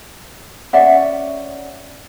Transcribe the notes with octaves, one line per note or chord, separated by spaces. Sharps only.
C#4 D5 E5 F#5